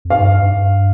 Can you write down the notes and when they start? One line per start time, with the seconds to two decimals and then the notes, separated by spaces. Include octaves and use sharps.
0.05 F2
0.10 G2 F5
0.43 G2